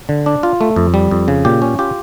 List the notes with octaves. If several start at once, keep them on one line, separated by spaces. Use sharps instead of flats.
D3
D4
F4
A3
F2
G3
F2
C#3
A#2 G4
C#4
F4 G4